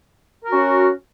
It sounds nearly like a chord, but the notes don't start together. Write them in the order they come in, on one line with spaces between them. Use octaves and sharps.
A#4 F#4 C#4